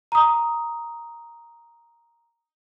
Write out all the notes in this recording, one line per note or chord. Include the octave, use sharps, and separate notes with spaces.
A#5 D#6